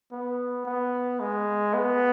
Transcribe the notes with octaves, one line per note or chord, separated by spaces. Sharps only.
B3
B3
G#3
B3